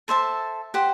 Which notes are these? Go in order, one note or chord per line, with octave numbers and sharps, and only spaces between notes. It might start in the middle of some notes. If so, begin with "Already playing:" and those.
A4 C5 E5 A5
G4 C5 F#5